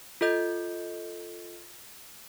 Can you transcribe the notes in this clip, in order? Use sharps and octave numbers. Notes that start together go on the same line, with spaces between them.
F4 A4 D#5 G6